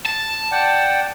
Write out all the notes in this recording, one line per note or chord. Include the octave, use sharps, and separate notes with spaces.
A5
D5 F#5 G5